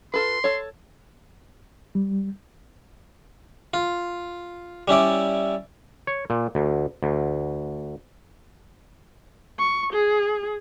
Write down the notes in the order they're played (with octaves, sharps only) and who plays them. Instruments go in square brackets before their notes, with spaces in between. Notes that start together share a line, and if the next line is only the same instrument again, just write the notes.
[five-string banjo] F4 A4 B4 [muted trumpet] C6
[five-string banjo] A4 C#5
[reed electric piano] G3
[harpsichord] F4
G3 C#4 E4 D5
[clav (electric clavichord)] C#5
A#2
D2
D2
[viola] C#6
G#4